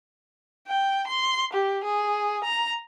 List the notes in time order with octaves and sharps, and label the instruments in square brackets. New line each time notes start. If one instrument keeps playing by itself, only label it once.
[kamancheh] G5
C6
G4
G#4
A#5